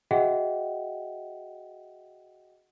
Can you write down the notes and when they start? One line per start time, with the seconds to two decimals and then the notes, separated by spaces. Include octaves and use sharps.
0.11 F#4 G#4 D#5 E5 F#5 G5